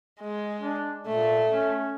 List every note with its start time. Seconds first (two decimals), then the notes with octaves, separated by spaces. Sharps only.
0.21 G#3
0.61 D4
1.07 A#2 A3
1.49 C#4